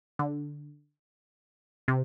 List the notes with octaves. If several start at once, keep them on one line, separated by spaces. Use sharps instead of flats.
D3
C3